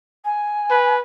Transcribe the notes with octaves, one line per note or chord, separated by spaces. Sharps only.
G#5
B4